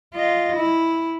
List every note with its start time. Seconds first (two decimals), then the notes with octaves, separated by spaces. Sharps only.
0.14 F4 D#5
0.56 E4